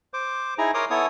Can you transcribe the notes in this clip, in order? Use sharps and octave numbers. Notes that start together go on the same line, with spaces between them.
C5 D6
D#4 E4 G#4 G#5 A#5
A#4 C#5 A#5 C6 D6 D#6
B3 E4 A4 C#5 G#5 D#6